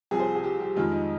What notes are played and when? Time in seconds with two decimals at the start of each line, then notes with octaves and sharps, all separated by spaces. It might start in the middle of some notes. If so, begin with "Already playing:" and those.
0.11 C2 C3 F3 G#4
0.19 C5
0.36 G#4
0.44 G4
0.60 G4
0.76 F2 D#3 G#3 F4
0.92 D#4